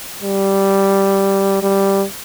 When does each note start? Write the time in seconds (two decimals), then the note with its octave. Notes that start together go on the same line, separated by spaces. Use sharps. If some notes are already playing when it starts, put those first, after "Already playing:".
0.22 G3
1.62 G3